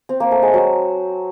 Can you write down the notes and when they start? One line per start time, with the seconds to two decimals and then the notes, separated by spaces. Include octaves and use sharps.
0.09 C4
0.20 A#3
0.31 A3
0.42 G#3
0.53 F#3